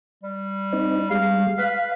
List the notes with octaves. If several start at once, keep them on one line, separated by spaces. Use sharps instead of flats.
G3
C4 D#4
G3 G#3 F5
B4 F5